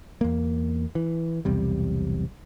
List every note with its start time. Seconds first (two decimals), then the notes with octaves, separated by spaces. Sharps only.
0.21 E2 A#3
0.95 E3
1.45 B1 E2 C3 G3